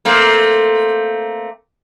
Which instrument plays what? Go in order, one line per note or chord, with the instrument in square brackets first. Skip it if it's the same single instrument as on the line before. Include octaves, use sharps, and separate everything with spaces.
[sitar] A3 A#3 C4